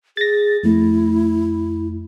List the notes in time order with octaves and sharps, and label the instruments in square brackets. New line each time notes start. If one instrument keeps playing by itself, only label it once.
[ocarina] G#4 [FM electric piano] A6 A#6
[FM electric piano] F2 A3 [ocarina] E4